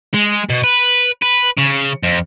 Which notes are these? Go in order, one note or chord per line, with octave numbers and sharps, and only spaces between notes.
G#3
B2
B4
B4
C#3
F2